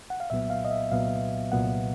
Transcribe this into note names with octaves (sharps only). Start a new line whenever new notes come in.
F#5
F5
C2 A#2 F#3 B3 E5
F5
D#5
E5
C2 A#2 F#3 B3 F5
C2 A#2 F#3 B3 F#5